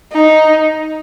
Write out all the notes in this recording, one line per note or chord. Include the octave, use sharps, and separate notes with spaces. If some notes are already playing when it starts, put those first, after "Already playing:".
D#4